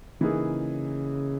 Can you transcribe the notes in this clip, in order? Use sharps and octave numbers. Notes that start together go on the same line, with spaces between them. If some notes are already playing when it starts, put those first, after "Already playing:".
C#3 E3 A#3 D#4 G#4